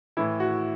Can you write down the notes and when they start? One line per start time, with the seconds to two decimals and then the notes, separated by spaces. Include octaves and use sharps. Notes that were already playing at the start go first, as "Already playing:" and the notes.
0.17 A2 E3 E4
0.40 F#4